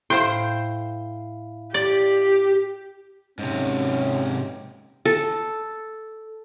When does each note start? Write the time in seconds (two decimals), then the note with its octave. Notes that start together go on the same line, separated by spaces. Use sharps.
0.10 A2 E4 C5 F5 G5
1.74 G4 D5
3.39 G#2 C3 C#4
5.05 A4